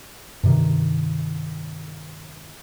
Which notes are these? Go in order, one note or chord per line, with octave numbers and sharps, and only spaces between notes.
G2 C3 D#3